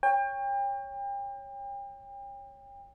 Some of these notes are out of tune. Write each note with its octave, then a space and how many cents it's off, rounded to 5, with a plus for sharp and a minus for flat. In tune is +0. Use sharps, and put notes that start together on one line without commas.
C#5 +0 G5 +35